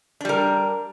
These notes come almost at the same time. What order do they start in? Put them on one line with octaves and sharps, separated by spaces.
D4 G3 A#4